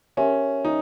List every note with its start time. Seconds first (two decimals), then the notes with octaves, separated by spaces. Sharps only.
0.17 C#4 G4 A#4 E5 G#5
0.65 D#4